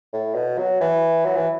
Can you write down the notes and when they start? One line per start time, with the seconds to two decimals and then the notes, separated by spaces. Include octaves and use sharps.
0.13 A2
0.35 B2
0.58 F#3
0.81 E3
1.25 F#3
1.36 E3